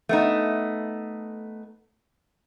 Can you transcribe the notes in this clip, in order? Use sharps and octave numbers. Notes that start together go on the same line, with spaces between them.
A3 B3 D#4